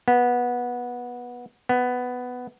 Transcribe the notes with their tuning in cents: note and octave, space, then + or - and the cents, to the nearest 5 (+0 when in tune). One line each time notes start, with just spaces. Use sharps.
B3 -15
B3 +10